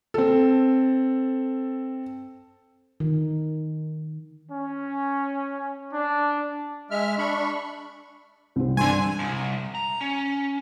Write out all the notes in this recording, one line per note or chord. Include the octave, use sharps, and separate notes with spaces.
C4 A4
D#3
C#4
D4
G#3 E5 F6
D4 B5 C#6
C2 C4
G2 D3 G#5 C6
C2
A#5
C#4